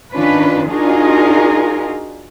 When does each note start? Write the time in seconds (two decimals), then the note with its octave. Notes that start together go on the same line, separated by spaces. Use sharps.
0.13 D#3 C#4 D4 F4 B4
0.67 D4 D#4 F4 F#4 G#4 A#4